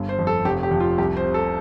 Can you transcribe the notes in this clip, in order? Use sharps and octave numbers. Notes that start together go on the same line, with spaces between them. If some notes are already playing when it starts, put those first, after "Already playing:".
Already playing: G1 G2
C5
F2
A4
F1 G4
G4
F2
F4
C2 G4
C5
C3
A4